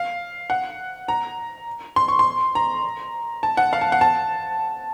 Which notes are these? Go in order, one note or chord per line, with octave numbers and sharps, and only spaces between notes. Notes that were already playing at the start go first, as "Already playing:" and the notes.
Already playing: F5
F#5
A#5
C6
C#6
C6
A#5
A5
F#5
F5
A5
F#5
A5